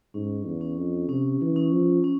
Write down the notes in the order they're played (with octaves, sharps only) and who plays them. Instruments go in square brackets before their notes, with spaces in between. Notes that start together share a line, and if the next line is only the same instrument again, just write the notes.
[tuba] G#2 [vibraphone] C#4
[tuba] E2
[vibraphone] C#4
[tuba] F2
[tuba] C3 [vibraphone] C#4
[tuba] E3
[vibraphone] C#4
[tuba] F3
[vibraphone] C#4